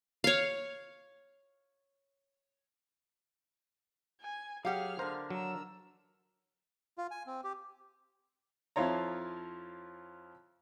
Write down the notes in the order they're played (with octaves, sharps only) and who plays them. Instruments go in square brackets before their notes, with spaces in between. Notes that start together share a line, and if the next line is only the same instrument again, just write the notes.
[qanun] C#5 F5
[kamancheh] G#5
[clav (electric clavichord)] F#3 G4 [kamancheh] G#4 F6 [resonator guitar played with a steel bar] F5 F#5
[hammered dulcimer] D3 A#4 [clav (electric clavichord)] C5
[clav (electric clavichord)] F#3 [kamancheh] A#5 E6
[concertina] F4
G#5
C4
G4
[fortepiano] F2 F3 E4 F4 C#5 A#5